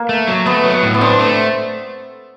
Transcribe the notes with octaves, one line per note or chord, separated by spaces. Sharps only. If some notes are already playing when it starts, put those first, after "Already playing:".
Already playing: A#3
A3
F#3
A3 B3
F#3
A2
B3
C4 D4
A3